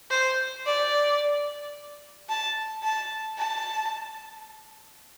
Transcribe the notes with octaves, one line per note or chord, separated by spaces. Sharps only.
C5
D5
A5
A5
A5